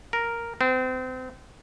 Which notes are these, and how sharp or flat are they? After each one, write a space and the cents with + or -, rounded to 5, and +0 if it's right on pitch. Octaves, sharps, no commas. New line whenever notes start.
A#4 +0
C4 -35